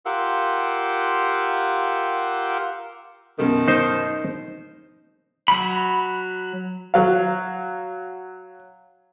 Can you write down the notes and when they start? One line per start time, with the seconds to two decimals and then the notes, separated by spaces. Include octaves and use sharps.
0.06 F4 G4 A#4 F5 F#5 E6
3.39 F#2 B2 D#3 B3
3.68 D#4 C5
5.48 F#3 B5
6.94 F#3 F5